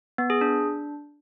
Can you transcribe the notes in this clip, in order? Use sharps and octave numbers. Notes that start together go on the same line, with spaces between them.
B3
G#4
D4